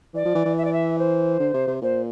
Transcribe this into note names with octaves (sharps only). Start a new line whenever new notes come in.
E3 D5
F3
E3
E3
E5
D5
E5
C5
D3
C3
C3
A#2 C5